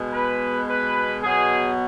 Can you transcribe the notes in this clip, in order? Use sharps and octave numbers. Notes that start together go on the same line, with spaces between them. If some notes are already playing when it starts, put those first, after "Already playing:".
Already playing: B2 G#3
B4
B4
B2 F#3 G#4